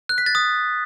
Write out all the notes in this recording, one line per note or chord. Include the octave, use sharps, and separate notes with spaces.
F#6
B6
A6
D#6